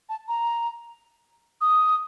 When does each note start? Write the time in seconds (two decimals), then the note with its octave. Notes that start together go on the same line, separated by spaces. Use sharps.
0.09 A5
0.28 A#5
1.61 D#6